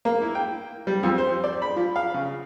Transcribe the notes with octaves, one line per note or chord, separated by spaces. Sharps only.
A#3
E4
G5
G3
F2
C5
D5
B5
F3
F5
C#3